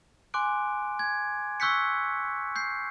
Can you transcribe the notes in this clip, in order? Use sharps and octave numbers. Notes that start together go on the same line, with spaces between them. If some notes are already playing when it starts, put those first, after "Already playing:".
G#5 C6 D6 F#6 D7
G#6
C#6 E6 F#6 G6 B6 C#7
G6 C7